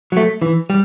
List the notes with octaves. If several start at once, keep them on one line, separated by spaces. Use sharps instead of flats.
F#3 A3
E3
G3